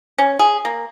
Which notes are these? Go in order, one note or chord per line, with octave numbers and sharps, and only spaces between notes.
C#4
G#4
A#3